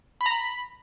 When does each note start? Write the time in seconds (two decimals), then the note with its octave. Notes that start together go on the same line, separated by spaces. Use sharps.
0.21 B5
0.26 A#5
0.31 B5